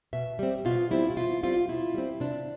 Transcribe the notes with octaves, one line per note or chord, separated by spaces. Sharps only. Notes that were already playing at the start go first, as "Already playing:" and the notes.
B2 E5
G3 C4
B2 F4
G3 C4 E4
E4
B2 F4
G3 C4 F4
B2 E4
G3 C4
C3 D4